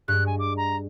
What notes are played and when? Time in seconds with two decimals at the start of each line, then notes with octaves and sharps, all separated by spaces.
0.08 G2 G#3 F#6
0.26 G#5
0.39 D6
0.57 A#5